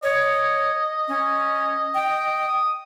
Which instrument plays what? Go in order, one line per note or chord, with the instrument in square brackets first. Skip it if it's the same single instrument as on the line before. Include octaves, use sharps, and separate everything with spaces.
[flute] C#5 [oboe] D#5
[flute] C#4
G5
[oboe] D#6